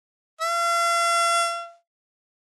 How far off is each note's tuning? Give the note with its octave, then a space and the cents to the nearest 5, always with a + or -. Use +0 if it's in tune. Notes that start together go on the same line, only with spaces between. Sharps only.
F5 -40